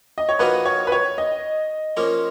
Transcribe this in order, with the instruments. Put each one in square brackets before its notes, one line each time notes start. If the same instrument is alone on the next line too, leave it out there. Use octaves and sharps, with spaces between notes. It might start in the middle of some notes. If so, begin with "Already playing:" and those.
[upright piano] D#5
C#5
[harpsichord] F3 A#3 D#4 F#4 A#4 [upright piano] B4
[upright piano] C#5
B4
C#5
D#5
[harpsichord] F3 A#3 C#4 F4 A#4